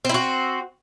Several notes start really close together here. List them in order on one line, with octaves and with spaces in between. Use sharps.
C4 E4 F#4